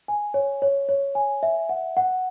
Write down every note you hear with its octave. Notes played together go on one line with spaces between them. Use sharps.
G#5
C#5
C#5
C#5
G#5
E5
F#5
F#5